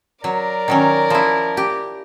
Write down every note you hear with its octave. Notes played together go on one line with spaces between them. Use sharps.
F#3 A#4 D5
D#3 F#3 C#4
F3 E4
G4